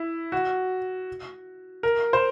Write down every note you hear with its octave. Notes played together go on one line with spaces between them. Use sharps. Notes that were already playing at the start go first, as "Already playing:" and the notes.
Already playing: E4
F#4
A#4
C5